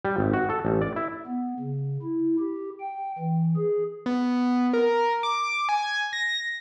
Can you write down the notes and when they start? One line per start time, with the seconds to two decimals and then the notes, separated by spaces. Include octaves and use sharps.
0.05 G3
0.18 G#1
0.33 F#4
0.50 A4
0.65 A1
0.82 D5
0.96 E4
1.27 B3
1.60 C#3
2.03 E4
2.39 G4
2.80 G5
3.18 E3
3.57 G#4
4.06 B3
4.73 A#4
5.23 D6
5.69 G#5
6.13 A#6